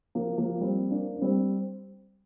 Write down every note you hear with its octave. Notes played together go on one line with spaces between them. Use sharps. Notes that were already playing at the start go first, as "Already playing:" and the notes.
F3 A#3
F3 A#3
G3 C4
A#3 D4
D4
G3 C4